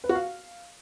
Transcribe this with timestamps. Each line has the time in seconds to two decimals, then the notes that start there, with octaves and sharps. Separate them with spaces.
0.04 B4
0.09 F#4
0.15 F5